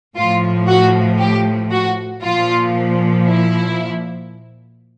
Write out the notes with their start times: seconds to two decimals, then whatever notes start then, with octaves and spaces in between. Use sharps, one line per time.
0.16 A2 F3 F4
0.67 F#4
1.19 G4
1.71 F#4
2.22 A#2 F3 F4
3.26 E4